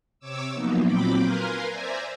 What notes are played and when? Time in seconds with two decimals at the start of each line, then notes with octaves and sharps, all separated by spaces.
0.19 C3 C#5 D6 E6
0.52 F3 F#3 A#3 B3 D#4
0.84 A#2 F#3 C4 G5 B5 D6
1.20 A#4 B4 F5 G#5 A#5 C6
1.69 C5 D5 E5 G#5 A#5